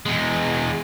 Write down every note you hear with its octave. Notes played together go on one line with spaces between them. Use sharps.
E2 G#3